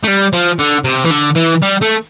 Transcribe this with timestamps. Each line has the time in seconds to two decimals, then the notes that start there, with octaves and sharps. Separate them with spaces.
0.03 A3
0.07 G3
0.33 F3
0.59 D3
0.84 C3
1.05 E3
1.11 D3
1.36 E3
1.63 G3
1.82 A3